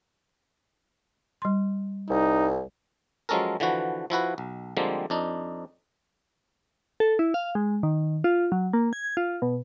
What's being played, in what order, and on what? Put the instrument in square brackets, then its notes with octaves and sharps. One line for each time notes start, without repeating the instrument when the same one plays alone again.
[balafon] G3 C6
[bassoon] C2 [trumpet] D#4
[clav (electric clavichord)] F3 F#3 G#3 C#4 A4 A#4
D3 E3 F3 F#4 B4
F3 E4 F#4 B4
B1
D3 F3 G3 G#3 A#3 C4
F2 D4 D#4
[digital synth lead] A4
E4
F5
G#3
D#3
F4
F#3
A#3
G#6
F4
B2